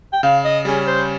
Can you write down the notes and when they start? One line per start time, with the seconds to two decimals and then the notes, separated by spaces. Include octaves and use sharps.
0.13 G5
0.23 C#3 F5
0.44 D#5
0.65 G3 C#4 G#4
0.87 C5